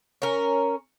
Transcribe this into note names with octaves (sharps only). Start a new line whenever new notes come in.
C#4 A#4